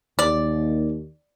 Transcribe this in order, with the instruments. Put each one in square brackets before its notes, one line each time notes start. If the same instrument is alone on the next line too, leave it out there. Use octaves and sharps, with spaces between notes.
[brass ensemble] D#2 [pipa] D5